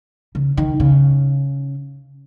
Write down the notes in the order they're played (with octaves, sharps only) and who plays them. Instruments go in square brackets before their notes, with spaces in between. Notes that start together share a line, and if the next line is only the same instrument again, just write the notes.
[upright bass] C#3
D#3
C#3